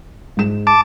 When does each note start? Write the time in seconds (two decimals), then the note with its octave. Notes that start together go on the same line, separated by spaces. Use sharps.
0.37 G#2 E7
0.67 A5 D6